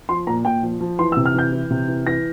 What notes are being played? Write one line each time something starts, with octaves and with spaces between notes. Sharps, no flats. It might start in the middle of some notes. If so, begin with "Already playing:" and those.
F3 C6
A#2 A#5
A#2 G5
F3
F3
E3 C6
E6
C3
F6
E3 G6
E3
C3
E3
E3 A#6